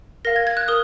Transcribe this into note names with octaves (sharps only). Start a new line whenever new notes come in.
A#4 F5 A#6
G#6
G#6
F#6
A#4 D#6